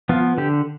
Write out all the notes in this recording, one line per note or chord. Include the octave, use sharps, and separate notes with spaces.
F3 B3 F4
D3 G4